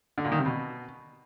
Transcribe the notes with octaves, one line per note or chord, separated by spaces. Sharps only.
D3
A#2
D#3
C3
B2